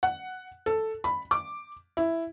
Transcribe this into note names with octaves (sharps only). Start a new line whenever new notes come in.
F#5
A4
B5
D6
E4